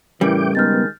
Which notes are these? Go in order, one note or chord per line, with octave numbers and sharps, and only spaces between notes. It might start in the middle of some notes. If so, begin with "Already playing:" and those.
A2 C#3 E3 G3 A#4 G5 D6
D#3 G#3 B3 F6 G6 A6